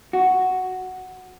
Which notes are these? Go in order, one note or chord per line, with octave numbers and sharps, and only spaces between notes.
F#4